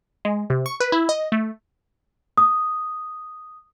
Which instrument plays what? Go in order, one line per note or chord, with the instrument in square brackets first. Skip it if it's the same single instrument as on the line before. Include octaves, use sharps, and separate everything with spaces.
[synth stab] G#3
C3
C#6
B4
E4
D#5
A3
[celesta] D#6